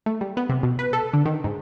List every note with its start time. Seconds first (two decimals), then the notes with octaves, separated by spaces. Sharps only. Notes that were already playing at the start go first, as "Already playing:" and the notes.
0.06 A3
0.21 G3
0.37 B3
0.49 C3
0.63 B2
0.79 B4
0.93 A4
1.13 D3
1.25 D#3
1.44 G#2